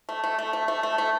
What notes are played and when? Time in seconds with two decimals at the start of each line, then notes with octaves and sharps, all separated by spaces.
0.09 A3
0.24 A3
0.38 A3
0.53 A3
0.68 A3
0.83 A3
0.98 A3